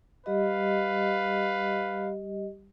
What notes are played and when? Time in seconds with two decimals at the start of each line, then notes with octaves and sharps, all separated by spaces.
0.26 G3 G4 B4 D#5 F5